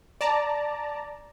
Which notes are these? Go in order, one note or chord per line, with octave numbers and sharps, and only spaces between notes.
D5 A5 A#5